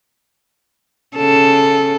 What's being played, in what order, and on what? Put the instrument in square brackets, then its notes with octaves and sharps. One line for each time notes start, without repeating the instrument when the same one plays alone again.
[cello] C#3 [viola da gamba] A4